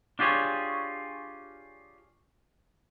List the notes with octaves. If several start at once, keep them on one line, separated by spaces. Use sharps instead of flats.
D4 F4 G4 G#4 C#5